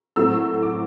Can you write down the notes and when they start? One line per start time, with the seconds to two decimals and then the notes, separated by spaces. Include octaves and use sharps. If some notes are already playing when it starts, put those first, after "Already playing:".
0.16 A2 F#3 A3 C4 E6
0.63 D6